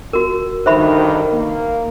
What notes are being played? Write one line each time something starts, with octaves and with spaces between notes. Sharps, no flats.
F#4 A#4
D2 G2 D#3 C5 E5 B5
A#3